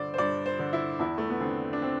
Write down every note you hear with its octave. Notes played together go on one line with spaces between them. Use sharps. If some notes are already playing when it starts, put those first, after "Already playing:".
Already playing: G2 D3 C5 D5
C5
G2 D5
C5
D3
E4
E2 E4
A3
B3
D3 C4
D4
C4